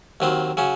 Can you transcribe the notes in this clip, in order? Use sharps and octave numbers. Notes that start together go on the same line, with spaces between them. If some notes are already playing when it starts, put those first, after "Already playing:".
D#2 D#3 F#3 C4
C#3 F#3 C#4